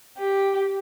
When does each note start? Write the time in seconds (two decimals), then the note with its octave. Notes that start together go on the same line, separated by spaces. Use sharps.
0.18 G4